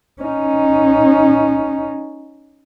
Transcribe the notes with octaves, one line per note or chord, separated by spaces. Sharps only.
C#4 D#4